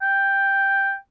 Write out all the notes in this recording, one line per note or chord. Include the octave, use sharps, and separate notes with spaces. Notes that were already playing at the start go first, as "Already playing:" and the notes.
G5